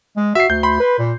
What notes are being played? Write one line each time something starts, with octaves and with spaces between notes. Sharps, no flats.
G#3
F#4 E5 C7
D2 G6
B5 C6
B4
A#2